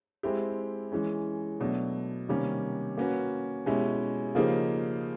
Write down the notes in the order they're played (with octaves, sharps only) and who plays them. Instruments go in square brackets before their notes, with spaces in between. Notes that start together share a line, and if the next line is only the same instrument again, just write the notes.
[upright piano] G#3 C4 E4 G4
E3 G#3 C#4
B2 F#3 A3 D4
C3 D#3 G3 A#3 C#4
A#3 C#4 F#4 B4
B2 G#3 C#4 E4 G4
C#3 F3 A#3 D#4 G4